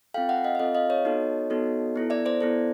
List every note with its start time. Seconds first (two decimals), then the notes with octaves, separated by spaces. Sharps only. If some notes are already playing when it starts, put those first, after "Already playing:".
0.14 C4 F4 A4 F5 G5
0.29 E5 F#5
0.44 D#5 F5
0.55 E5
0.59 C4 F4 A4 D#5 F5
0.75 D#5 F5
0.90 C#5 D#5
1.05 B3 D#4 F#4 A4
1.50 B3 D#4 F#4 A4
1.96 B3 E4 A4
2.10 D5 E5
2.26 C5 D5
2.41 B3 E4 A4